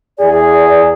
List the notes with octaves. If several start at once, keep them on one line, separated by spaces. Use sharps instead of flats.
E2 G#4 D5